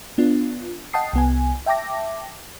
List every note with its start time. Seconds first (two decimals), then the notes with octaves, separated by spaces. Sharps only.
0.18 B3 D4 F4
0.93 D#5 F#5 G5 A5 D#6 C7
1.13 C2 B3 G#5
1.66 E5 G5 A5 D6 A#6